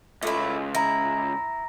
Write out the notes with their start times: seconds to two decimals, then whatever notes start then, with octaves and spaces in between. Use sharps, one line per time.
0.23 C#2 A3 E4
0.75 E4 A#5 A#6